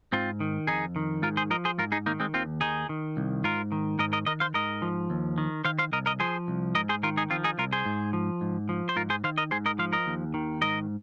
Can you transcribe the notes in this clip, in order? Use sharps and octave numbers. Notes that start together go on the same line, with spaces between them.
G#2 C4 F4
D#3
F2 D#4 G#4
D#3
G#2 F4 A#4
G#4 C5
F3 A#4 D#5
G#4 C5
G#2 F4 A#4
D#4 G#4
D#3 A#3 D#4
G#3 C4
D#2 C4 F4
D#3 D#4 G#4
D#3
C2
G#2 F4 A#4
D#3
G#2 A#4 D#5
A#4 D#5
D#3 A#4 D#5
C5 F5
G#2 A#4 D#5
F3
D#2
D#3
D#3 C5 F5
C5 F5
C2 A#4 D#5
A#4 D#5
F3 G#4 C5
C2
G#2 A#4 D#5
G#4 C5
D#3 F4 A#4
D#4 G#4
F3 C4 F4
D#4 G#4
C2 F4 A#4
G#4 C5
G#2
F3
G#2
F3
C5
G#2 F4 A#4
G#4 C5
D#3 C5 F5
A#4 D#5
G#2 G#4 C5
A#4 D#5
F3 C5 F5
A#4 D#5
D#2
D#3
G#2 A#4 D#5